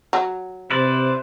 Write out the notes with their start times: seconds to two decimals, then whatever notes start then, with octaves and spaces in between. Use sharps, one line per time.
0.13 F#3
0.70 C3 E4 B4 C5 D5